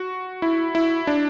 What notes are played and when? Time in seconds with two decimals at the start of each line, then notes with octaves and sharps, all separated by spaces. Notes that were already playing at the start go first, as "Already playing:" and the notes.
Already playing: F#4
0.42 E4
0.75 E4
1.07 D4